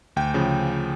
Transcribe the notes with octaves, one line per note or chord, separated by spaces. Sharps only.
D2 G5
C#3 F3